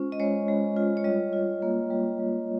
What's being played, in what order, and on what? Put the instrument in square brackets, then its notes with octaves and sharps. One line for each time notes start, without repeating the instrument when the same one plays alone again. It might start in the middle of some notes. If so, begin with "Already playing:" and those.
Already playing: [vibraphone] G#3 C#4 F4 C5
D#5
G#3 C#5
G#3
F4
C#5
G3 D#5
F4
A#3
G3
G3